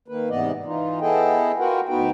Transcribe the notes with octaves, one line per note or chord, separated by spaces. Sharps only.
D#3 A#3 B4
G#2 C3 E3 B3 D5 D#5
E3 D#4 F4
B3 E4 G#4 A4 D#5 G5
F4 F#4 A#4 B4 F#5 G5
D2 B3 D#4 F#4 B4 G5